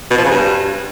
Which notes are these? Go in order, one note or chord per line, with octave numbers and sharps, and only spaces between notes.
B2
F3
C#3
G2